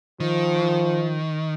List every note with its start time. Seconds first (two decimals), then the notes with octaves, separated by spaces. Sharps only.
0.20 D#3 F3